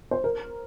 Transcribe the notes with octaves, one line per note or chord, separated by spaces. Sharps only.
C5
A#4